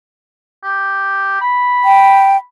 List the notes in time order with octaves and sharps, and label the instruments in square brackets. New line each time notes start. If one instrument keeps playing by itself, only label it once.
[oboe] G4
B5
[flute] G5